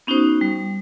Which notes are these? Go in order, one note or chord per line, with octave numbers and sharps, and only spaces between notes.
B3 C#4 D#4 F#4 C5 D#6
G3